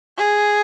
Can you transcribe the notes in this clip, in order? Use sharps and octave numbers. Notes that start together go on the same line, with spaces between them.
G#4